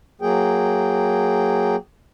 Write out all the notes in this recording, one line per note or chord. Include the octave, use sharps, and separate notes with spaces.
F#3 A#3 G#4 G5